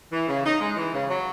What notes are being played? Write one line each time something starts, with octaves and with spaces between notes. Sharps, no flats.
E3
C#3
D#4
G#3
E3
C#3
F#3